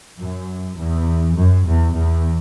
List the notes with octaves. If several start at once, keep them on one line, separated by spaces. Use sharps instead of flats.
F#2
E2
F#2
E2
E2